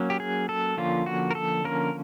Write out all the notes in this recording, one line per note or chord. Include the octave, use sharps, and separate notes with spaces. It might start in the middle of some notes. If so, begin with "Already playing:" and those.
Already playing: F#3 A#3 C#4
G4
G#4
A4
D3 F3 A#3 C#4 F4
F#4
A#4
A4
D3 F3 A#3 C#4 A#4